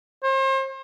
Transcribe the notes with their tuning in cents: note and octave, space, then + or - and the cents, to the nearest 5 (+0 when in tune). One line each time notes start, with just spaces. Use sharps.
C5 +40